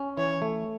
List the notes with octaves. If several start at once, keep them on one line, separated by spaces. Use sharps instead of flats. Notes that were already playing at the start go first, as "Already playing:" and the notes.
Already playing: C#4
E3 C#5
A3